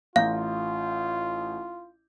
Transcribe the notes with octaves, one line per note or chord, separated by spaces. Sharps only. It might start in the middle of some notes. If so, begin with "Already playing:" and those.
A1 F4 F5 A#5 G6